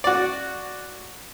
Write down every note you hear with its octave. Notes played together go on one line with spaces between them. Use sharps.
F#4 D5